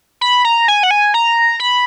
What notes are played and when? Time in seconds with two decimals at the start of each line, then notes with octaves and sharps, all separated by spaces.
0.21 B5
0.45 A#5
0.68 G#5
0.83 F#5
0.91 G#5
1.14 A#5
1.60 B5